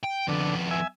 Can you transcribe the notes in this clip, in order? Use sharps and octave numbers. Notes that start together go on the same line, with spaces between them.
G5
F2 D3 B3
E5 G#5